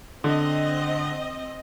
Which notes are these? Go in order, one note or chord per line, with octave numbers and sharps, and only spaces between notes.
D3 C4 D#5